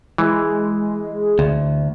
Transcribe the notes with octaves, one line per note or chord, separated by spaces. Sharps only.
E3 G#3
D2